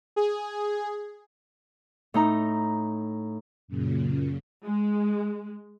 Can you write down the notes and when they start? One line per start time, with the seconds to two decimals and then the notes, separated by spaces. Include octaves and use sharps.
0.16 G#4
2.14 A2 D#4 A#5
3.68 F#2 A#2 C#3
4.65 G#3